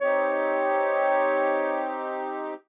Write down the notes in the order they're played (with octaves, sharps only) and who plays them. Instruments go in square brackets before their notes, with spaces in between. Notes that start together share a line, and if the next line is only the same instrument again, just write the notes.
[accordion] C4 D#4 G4 [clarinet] C#5